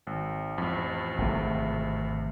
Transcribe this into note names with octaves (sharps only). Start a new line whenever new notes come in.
G#1
A1 F2
G#1 C3 A3